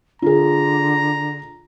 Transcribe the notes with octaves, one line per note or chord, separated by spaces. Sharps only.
D3 F4 G#4 A#5